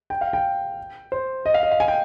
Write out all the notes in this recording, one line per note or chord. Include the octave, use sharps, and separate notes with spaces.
G5
F5
G5
C5
D#5
F5
D#5
F5
G#5
G5